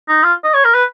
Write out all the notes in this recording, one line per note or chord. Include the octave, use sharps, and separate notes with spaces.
D#4
F4
D#5
C#5
A#4
B4